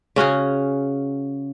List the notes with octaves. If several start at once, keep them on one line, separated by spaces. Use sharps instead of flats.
C#3 C#4 F#4 G#4